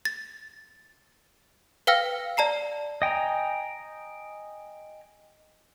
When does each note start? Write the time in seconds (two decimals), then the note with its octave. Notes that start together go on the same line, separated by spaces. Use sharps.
0.05 A6
1.87 B4 F5 G5 E6 F6 A#6
2.37 D5 A5 A#5 C7
3.02 D#5 G5 G#5 A#5